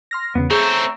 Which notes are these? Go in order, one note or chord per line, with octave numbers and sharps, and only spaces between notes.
C6 F6 A#6
E2 C#3 B3
A3 C4 G#4 C#5 E5 A#5